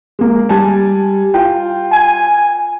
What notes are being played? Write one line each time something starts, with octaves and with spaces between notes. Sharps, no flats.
G#3 A#3
G3 G#5 A5
F4 G5
G#5